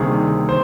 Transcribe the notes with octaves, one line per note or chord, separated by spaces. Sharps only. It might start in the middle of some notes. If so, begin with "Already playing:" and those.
Already playing: D2 C3 D#3 G3 A#3 G#4
C5